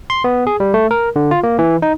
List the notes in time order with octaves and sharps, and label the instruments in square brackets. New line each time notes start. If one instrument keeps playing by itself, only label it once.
[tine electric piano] C6
B3
G#4
G3
A3
A#4
D3
F4
A#3
E3
D#4